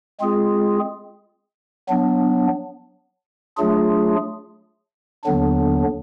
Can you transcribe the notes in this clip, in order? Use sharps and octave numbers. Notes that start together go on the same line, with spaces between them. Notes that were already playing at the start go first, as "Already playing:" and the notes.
G#3 C4 F4 G#4
F#3 B3 D4
F#3 A3 D4 F4 G#4
D#2 D3 F#3 B3 D4